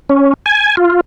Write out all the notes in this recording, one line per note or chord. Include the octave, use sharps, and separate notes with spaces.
C#4
G#5
F4